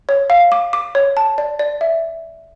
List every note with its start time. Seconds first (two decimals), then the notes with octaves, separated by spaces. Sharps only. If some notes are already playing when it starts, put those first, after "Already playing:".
0.09 C#5
0.30 F5
0.52 D6
0.73 D6
0.95 C#5
1.17 A5
1.38 D5
1.59 D5
1.81 E5